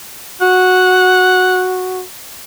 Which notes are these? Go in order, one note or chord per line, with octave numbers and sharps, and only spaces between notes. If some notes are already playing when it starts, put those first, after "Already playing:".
F#4 F#5